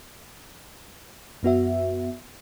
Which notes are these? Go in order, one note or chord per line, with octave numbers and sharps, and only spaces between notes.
F#2 B3 F#4 E5